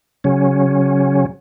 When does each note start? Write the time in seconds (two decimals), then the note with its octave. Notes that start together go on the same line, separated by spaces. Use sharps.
0.24 C#3 F#3 C#4